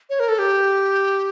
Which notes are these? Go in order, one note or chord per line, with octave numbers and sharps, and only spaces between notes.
C#5
A#4
A4
G4